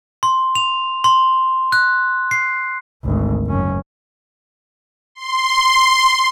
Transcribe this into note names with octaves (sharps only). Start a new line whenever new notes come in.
C6
F7
C6
F#6
C7
G#1 D2
F#1 C#4
C6